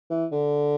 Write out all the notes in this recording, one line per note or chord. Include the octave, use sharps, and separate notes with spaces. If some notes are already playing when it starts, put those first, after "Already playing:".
E3
D3